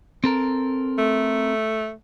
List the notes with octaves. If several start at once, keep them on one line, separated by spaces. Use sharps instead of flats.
C4 A4 A#4
A3